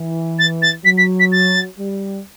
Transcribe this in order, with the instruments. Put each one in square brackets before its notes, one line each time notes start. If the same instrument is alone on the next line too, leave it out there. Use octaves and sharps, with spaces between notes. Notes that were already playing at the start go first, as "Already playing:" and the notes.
Already playing: [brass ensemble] E3
[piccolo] A6
A6
[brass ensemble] F#3 [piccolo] B6
[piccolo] B6
B6
A6
[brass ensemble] G3